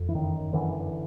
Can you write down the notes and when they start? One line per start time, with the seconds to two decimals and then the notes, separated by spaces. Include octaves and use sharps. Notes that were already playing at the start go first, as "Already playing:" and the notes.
Already playing: F2
0.09 E3
0.15 F#2 D#3
0.53 F#2 D3 E3